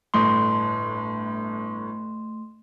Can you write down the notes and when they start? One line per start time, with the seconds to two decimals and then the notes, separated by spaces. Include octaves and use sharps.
0.14 G1 A2 A3 C6 G7